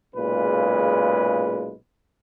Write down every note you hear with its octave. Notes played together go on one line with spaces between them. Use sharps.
B1 A#2 C#3 G#3 B4